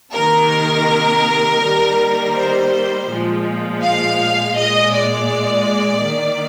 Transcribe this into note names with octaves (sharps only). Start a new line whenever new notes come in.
C3 D#3 A#3 A#4
D#3 G3 A#3
C5
A#2 F3 G#3
F5
A#2 G#3 D#5
D5
D#3 A#3